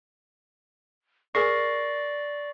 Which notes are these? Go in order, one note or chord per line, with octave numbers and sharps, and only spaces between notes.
G#4 A#4 D5 E5 C#6 A#6 C7